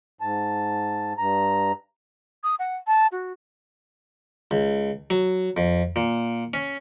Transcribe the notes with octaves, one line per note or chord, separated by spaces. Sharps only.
G#2 A5
G2 A#5
D#6
F#5
A5
F#4
C#2
F#3
F2
A#2
C#4